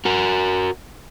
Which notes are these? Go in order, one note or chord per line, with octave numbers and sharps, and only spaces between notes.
F#4 A#4